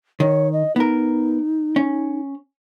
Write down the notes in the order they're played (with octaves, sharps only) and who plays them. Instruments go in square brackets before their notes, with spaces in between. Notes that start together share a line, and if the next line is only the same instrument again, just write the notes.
[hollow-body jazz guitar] D#3 [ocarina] C#5
[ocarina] D#5
[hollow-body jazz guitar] B3 A#4 [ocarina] D#4
[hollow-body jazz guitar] C#4